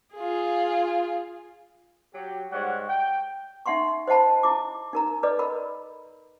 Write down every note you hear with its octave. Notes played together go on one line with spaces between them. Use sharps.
F4 G#4
F#3 G4
G#2 G3 C#5 F#5
G5
D#4 E5 F#5 C6 C#6
C5 D#5 F#5 A5 B5
E4 D6
D#4 A#4 A#5
A4 B4 D5 D#5
A#4 B5